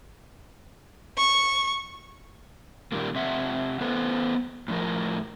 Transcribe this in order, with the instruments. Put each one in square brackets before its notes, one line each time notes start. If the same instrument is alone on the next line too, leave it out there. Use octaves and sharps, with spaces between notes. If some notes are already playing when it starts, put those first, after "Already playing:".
[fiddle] C#6
[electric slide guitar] A#2 D#3 G3 A#3
C3 E5 F#5
B3 A4 B4 C5
A2 F3 A#4